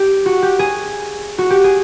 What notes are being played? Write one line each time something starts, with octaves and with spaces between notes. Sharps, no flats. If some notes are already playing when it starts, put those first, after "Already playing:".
Already playing: G4
F#4
G4
G#4
F#4
G4
G#4